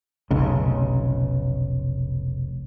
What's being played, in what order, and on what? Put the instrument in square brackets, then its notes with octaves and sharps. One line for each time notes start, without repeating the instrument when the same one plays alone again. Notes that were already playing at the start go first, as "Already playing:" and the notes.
[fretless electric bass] F1 B1 C#3